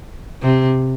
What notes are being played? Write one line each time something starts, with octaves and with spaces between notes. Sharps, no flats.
C3